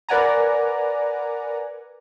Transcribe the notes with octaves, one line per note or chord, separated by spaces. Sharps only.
A#4 B4 D5 F#5 G#5 A#5